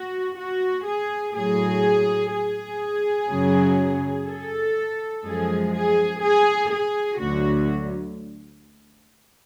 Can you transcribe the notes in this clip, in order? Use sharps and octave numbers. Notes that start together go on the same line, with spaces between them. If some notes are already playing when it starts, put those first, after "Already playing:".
Already playing: F#4
F#4
G#4
A2 F#3 G#4
G#4
F#2 C#3 F#3
A4
F#2 F3 G#3 G#4
G#4
G#4
G#4
D2 D3 F#3 F#4